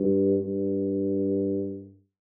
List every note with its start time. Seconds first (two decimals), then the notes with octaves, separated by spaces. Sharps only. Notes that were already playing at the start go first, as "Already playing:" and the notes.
Already playing: G2
0.41 G2